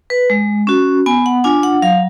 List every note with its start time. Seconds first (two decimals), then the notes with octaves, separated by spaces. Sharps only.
0.10 B4
0.30 G#3
0.67 C#4 F#4
1.06 B3 G#5
1.26 F#5
1.44 D4 F4 G#5
1.63 F#5
1.82 F#3 F5